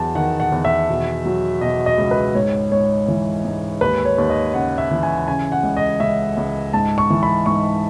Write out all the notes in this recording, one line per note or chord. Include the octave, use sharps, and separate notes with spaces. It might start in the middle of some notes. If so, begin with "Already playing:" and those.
Already playing: E2 F#3 A5
D#3 F#5
F#5
E2
E5
B2
F#3
B2 D#5
D#5
C#2
B4
G#2 C#5
G#2 C#5
E3
G#2
D#2 B4
C#5
D#2
D#5
C#3 F#5
E5
E3
G#5
C#3 G#5
F#5
C#2
D#5
C#2 E5
C#2
G#2 A5
C#6
E3
B5
G#2 C#6